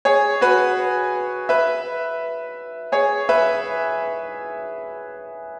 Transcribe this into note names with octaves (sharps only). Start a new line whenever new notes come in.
G#4 C#5
F#4 B4
B4 E5
G#4 C#5
B4 E5